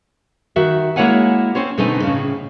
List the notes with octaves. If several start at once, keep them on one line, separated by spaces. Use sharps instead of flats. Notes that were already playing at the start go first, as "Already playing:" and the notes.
D#3 F#4 E5
G#3 A#3 E4 C#5 F#5 G#5
C4 C#4 C5 C#5
B2 D3 A3 C4 D#4 G#5
A2 C#3